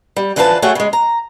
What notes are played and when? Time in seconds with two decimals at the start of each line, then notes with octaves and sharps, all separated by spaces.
0.16 G3
0.36 D3 E3 F3 F4 B4 A5
0.62 A3 F#4 G#4 C#5 G5
0.75 C#3 G#3
0.93 A#5